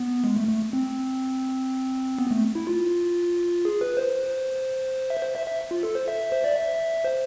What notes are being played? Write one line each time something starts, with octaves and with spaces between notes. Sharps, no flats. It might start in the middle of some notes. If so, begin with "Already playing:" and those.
Already playing: B3
G#3
A3
A3
C4
B3
A3
E4
F4
G#4
B4
C5
E5
C5
E5
E5
F4
A4
C5
E5
C5
D5
E5
C5